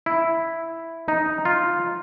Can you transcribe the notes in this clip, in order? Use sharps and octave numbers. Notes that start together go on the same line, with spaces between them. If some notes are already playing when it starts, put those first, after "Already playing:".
E4
D#4
F4